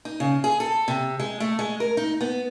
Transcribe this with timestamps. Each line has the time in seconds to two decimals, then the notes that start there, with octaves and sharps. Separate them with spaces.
0.05 D#4
0.20 C#3
0.44 G#4
0.60 A4
0.88 C3
1.20 G#3
1.40 A3
1.59 G#3
1.80 A#4
1.97 D#4
2.21 B3